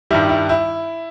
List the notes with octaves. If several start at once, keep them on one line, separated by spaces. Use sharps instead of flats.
G2 D#3 G3 E4
E4
E4